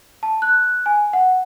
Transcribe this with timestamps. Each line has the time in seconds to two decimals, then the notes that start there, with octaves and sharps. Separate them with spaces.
0.23 A5
0.42 F#6
0.86 G#5
1.13 F#5